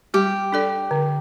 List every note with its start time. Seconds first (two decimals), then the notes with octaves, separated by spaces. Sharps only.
0.14 G3 G4
0.52 D4 A4 D5
0.91 D3